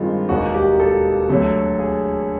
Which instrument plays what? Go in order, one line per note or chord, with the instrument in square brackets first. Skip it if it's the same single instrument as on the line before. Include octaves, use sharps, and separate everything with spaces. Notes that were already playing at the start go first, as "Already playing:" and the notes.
Already playing: [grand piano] G2 D#3 G#3 C4 F4
E1 D#2 D#3 F#4
G4
A4
D2 D3 F#3 A3
G#4